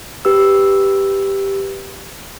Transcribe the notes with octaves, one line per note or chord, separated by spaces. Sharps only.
G4 B4 E6